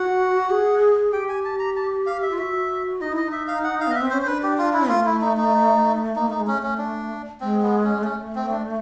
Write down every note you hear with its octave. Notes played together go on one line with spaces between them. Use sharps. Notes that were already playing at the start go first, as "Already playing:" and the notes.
Already playing: F#4 F#5
G#4
G4 G5
G#5
A5
A#5
A5
F5
E5
F4
F#4 E5
D#4 D#5
E4 D#5
D#4
E5
F5
F#5
F5
B3 D#5
E5
C4
C#4 C5
C5
D4 B4
G4
F4
E4
A3 F4
E4
D#4
D#4
A#3 D#4
A3 D#4
G#3
A3 C#4
C#4
D4
G#3 C4
B3
C#4
A3 C#4
C4
D4